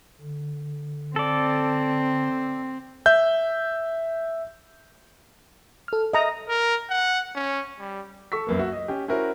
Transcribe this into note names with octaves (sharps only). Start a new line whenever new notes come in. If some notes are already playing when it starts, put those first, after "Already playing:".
D3
C4 A4 D5
E5 G6
A4 F6
D#5 E5 A#5
A#4
F#5
C#4
G3
A4 C#6 E6 B6
F#2 A#3 B3
F#4 E5
D#5
C#4 G4
C#4 E4 F#4 A#4 C5